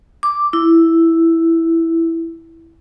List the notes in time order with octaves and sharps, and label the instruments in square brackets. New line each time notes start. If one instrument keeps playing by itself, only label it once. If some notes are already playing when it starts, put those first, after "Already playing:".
[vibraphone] D6
E4